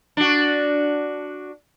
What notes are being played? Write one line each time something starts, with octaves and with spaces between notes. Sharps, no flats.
D4 F#4